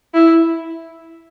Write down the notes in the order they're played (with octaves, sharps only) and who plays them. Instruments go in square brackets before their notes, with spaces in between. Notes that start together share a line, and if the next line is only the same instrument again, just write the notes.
[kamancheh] E4